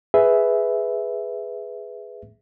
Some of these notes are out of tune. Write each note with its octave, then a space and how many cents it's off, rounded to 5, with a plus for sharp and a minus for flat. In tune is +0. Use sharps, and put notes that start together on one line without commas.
G#4 +0 B4 +5 E5 +0